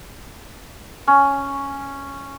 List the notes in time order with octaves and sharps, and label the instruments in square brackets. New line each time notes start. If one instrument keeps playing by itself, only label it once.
[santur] C#4